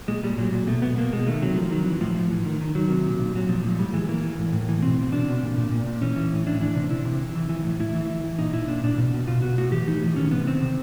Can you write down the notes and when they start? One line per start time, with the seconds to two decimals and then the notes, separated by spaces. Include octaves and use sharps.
0.08 A#2 G#3
0.23 A#2 G3
0.38 A#2 F#3
0.52 A#2
0.67 B2 A3
0.82 B2 B3
0.97 B2 A#3
1.13 B2 G#3
1.27 D#3 A3
1.42 C3 F#3
1.56 D#3 F3
1.71 D#3 F#3
1.86 E3
2.01 A2 F3
2.16 A2
2.31 E3
2.45 D#3
2.61 D#3
2.75 D#3 F#3
2.90 C3
3.06 A#2
3.20 A#2
3.35 A#2 F#3
3.49 A#2 F3
3.64 A2 F#3
3.79 A2 G3
3.93 E3 G#3
4.09 E3 A#3
4.23 E3
4.38 A2
4.53 A2
4.69 E3
4.82 B2 C4
4.98 B2
5.12 B2 D4
5.27 B2
5.43 A#2
5.57 A#2
5.72 A#2
5.86 A#2
6.02 E3 C#4
6.16 E3
6.32 A2
6.46 E3 D4
6.61 E3 D4
6.75 C3
6.90 C3 E4
7.05 C3
7.20 E3
7.36 E3
7.49 E3
7.64 A2
7.80 A2 E4
7.95 E3
8.10 E3
8.24 E3
8.39 A#2 D#4
8.54 A#2 E4
8.68 A#2 D4
8.83 A#2 D4
8.98 B2
9.14 B2
9.27 B2 F4
9.42 B2 F#4
9.58 A2 F#4
9.72 E3 G4
9.87 E3 D#4
10.02 A2
10.16 D#3 C#4
10.31 C3 B3
10.47 D#3 C4
10.61 C3